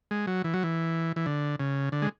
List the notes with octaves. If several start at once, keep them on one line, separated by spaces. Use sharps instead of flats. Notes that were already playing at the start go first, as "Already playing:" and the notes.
G#3
F#3
E3
F#3
E3
E3
D3
C#3
D3
G#3